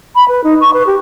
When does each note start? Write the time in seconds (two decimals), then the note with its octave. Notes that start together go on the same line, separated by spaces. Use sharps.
0.15 B5
0.28 B4
0.44 D#4
0.61 C#6
0.74 B4
0.87 G4